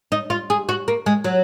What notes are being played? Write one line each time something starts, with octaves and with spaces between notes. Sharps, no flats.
D#4
F4
G#4
F#4
A#3
G#3
F#3